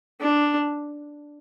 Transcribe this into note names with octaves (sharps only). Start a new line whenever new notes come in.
D4